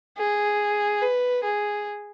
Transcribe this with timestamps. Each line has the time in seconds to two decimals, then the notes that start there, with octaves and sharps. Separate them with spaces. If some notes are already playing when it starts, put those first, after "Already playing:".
0.18 G#4
1.01 B4
1.43 G#4